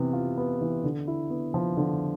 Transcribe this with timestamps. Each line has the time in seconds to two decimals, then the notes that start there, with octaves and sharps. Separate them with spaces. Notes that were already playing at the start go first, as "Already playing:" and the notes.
Already playing: C3 E3 B3
0.13 F4
0.37 B3
0.61 E3
0.84 D3
1.08 E4
1.30 B3
1.54 F3
1.77 D3